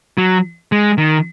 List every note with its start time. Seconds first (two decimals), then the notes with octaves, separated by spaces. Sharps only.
0.18 F#3
0.72 G#3
0.98 D#3